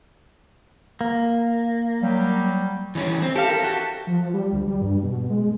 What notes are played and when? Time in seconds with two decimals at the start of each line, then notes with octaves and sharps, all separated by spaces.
1.01 A#3
2.01 F#3 G3
2.95 E3 G3 C#4
3.22 C4
3.35 G4 A4 F5
3.49 A#4
3.63 F#4 G4
4.07 F3
4.34 G3
4.52 D2
4.68 G3
4.82 G2
5.03 B2
5.30 G#3